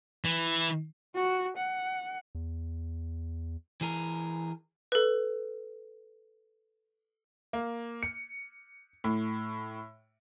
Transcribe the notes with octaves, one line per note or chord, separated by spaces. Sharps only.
E3
F#4
F#5
E2
E3 G#4 A#4
A4 B4
A#3
C#7
A2